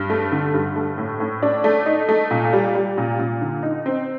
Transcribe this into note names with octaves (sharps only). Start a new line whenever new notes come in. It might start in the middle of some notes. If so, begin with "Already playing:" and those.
Already playing: G2
A3
D3
G2
A3
A2
A2
D4
A3
D#4
A3
A#2
G3
G3
A#2
A#2
D3
D#4
C4